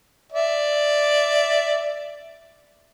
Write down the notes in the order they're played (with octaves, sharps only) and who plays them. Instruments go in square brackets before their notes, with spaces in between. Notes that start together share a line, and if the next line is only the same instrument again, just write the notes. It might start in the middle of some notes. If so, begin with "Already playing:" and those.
[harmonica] D5 E5